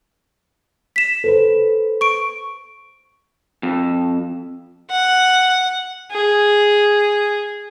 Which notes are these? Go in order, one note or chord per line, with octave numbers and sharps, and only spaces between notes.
B6 E7
A4 B4 C5
C#6 D7
F2
F#5
G#4